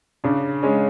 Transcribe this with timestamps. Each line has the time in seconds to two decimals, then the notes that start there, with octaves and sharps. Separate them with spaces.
0.24 C#3 D4
0.63 G#3 C#4